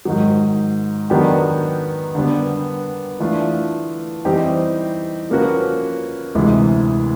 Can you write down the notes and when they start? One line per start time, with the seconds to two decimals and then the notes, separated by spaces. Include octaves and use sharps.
0.05 G#2 D#3 F#3
1.10 D#3 F#3 B3 D4 G4
2.15 D3 G3 B3
3.20 E3 A3 D4 F4
4.25 E3 G3 C4 D#4 G4
5.30 F3 A#3 C#4 F#4 B4
6.35 D2 C3 E3 G#3